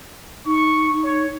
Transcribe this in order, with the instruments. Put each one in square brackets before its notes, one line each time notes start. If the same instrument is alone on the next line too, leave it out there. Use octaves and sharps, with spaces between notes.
[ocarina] D#4 [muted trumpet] C#6
[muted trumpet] C#5